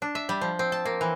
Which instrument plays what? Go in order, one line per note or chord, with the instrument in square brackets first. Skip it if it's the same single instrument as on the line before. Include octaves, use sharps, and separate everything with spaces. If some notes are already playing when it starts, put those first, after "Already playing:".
[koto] D4
E5
G3
F3
C4
A5
A#3
E3